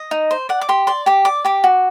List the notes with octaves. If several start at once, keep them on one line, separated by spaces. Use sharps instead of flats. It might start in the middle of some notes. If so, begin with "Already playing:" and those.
Already playing: D#5
D#4
C5
D5 F#5
D6
G4 C6
D5 C6
G4 D6
D5 D6
G4 D6
F#4